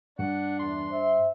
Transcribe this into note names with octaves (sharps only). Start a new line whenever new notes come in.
G2 D4 F#5
E2 C6
C5 E5